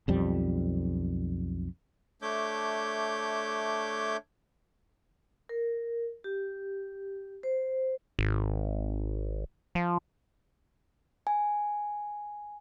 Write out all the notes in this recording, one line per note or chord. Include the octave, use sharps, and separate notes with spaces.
B1 F2 G3
A3 D4 C#5 E5 D6 G6
A#4
G4
C5
G#1
F3
G#5